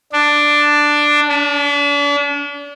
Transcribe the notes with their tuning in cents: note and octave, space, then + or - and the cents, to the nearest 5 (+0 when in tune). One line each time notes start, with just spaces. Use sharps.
D4 +5
D4 -40